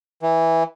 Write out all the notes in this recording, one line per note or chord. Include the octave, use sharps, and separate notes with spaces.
E3